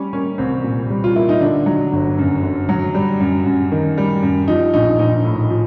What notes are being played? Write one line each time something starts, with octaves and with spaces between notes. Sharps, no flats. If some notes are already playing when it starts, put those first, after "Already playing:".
Already playing: G3 C#4
A#3 C#4
C2 C4
A#2
G3
F4
A#3 E4
D#4
D3 D4
F#3
G1
F#2
D3
F#3
G3
F#2
F#2
D#3
G3
F#2
F3 D#4
A#1 D#4
A#1 D#4
A2
F3